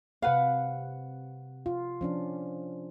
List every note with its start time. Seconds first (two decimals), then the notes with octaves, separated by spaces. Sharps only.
0.22 C3 B4 F5 F#5
1.66 F4
2.01 F3 C#4 D4